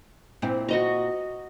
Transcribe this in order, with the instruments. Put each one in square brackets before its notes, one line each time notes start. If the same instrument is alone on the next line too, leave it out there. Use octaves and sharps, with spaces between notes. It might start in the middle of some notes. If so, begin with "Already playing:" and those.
[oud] A#2 C4 E4
[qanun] F#4 D#5 A#5